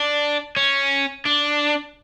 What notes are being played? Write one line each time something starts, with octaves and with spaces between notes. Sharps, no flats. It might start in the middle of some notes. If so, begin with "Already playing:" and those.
Already playing: D4
C#4
D4